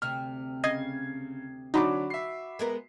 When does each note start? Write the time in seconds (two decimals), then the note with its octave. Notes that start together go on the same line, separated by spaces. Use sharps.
0.02 D2 C3 F6
0.64 C#3 D#5 G#6 C7
1.74 D3 F#3 D4 D#4 F#4 B5 D6
2.10 E5 C7
2.59 G#3 B3 A#4